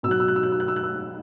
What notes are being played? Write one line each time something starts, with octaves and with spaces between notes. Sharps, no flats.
B2 F#3 E6 F#6
E6
F#6
E6
F#6
E6
F#6
E6
F#6
E6